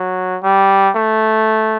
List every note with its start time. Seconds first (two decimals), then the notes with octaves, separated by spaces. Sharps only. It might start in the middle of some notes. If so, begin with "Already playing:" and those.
Already playing: F#3
0.43 G3
0.96 A3